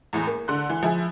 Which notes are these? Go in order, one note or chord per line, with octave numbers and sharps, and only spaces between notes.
E2 A2 E3
A#3
D3 C6 F#6
E3
F3 E4 G#4